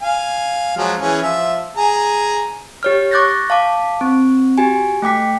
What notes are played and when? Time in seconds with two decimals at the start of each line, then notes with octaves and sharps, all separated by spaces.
0.01 F5 G#5
0.77 F3 F#3 G#3
1.00 E3 C#4 G#4
1.22 F3 E5
1.77 G#4 G#5 A#5
2.83 G4 C#5 F6
3.11 C#6 D6 F#6 G6 A6 A#6
3.50 F5 A5 D6
4.01 C4
4.58 F#4 G4 G#5
5.02 A3 G5 D6 B6